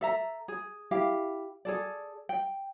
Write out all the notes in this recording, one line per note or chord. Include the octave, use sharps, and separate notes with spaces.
A4 E5 A#5
G#4
E4 G4 F5
G#4 A4 D5
G5